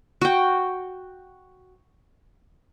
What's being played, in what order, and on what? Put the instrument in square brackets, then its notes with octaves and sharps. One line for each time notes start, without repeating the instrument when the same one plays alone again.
[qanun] F#4 G5